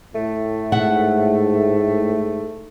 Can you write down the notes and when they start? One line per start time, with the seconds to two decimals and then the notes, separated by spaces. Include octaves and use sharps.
0.15 A2 A3
0.72 G#2 E5 F#5